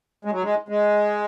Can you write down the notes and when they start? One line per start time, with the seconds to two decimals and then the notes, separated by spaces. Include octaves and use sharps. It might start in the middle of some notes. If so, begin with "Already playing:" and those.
0.25 G#3
0.32 F#3
0.43 G#3
0.69 G#3